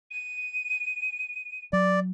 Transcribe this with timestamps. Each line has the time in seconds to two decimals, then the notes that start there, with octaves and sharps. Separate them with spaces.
0.10 D#7
1.73 F#3 D5